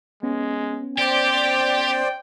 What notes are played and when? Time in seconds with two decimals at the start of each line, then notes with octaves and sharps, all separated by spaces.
0.23 G#3 B3 C#4
0.99 G4 C5 D5 G5